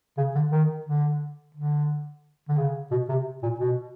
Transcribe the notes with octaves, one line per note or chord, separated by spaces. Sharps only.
C#3
D3
D#3
D3
D3
D3
C#3
B2
C3
A#2
B2